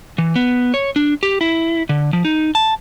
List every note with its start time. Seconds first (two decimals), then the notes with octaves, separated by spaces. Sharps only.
0.18 E3
0.36 B3
0.74 C#5
0.96 D4
1.23 G4
1.41 E4
1.89 D3
2.13 F3
2.25 D#4
2.55 A5